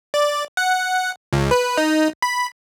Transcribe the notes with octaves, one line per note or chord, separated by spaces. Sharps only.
D5
F#5
C#2
B4
D#4
B5